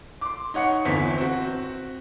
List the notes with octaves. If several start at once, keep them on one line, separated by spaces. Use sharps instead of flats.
C6 D6
D#4 C#5 F#5 C#6 C#7
G1 E2 C4 B6
C4 F#4